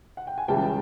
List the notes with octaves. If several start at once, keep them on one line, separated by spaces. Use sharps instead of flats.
F#5
G5
G#5
C#2 C#3 E3 G3 G5 A5